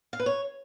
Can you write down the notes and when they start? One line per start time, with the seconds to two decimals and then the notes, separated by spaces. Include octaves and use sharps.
0.13 F5
0.20 B4
0.26 C#5